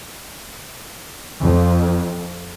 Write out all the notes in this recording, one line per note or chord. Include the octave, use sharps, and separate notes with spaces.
F2